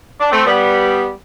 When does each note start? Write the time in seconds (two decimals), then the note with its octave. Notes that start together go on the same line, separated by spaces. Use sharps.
0.20 D4
0.31 A3 C4
0.46 G3 B3